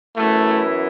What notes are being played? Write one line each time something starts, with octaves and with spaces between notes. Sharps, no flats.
F#2 E3 A3 B3 E4